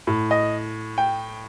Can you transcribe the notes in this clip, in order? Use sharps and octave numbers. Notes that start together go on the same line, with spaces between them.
A2
D#5
G5